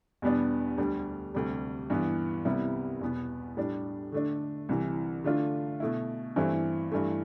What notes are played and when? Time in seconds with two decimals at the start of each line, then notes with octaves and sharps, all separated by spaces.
0.22 E2 B2 G3 B3 D4
0.78 D2 D3 G3
1.35 D2 C3 G3
1.90 G2 E3 B3
2.45 C2 C3 G3 B3 E4
3.01 E2 B2 B3
3.57 A2 G3 D4
4.12 D3 A3 D4
4.69 C2 C3 E3
5.24 D3 A3 D4 F4
5.80 B2 A3 E4
6.36 G2 E3 A3 C4 E4
6.92 G2 E3 A3